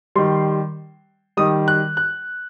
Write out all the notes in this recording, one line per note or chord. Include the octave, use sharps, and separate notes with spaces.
D#3 G3 C6
D#3 G3 D#6
F#6
F#6